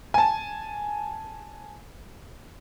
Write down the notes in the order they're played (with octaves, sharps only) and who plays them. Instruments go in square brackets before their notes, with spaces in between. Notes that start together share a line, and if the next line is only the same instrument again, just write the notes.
[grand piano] G#5 A5